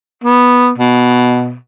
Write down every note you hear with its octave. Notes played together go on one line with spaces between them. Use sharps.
B3
B2